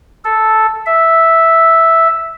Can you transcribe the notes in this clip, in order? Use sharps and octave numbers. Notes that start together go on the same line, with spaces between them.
A4
E5